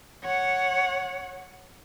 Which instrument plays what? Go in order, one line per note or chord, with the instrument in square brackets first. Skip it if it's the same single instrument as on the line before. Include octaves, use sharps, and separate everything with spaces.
[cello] C#5 F#5